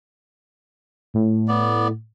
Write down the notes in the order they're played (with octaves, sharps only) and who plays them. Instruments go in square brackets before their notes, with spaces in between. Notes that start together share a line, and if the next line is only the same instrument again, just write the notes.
[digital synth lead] A2
[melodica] B3 D5